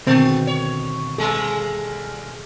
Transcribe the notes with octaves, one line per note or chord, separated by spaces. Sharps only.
B2 D3 D#3 G#3 C4
C#5
G3 G#3 A4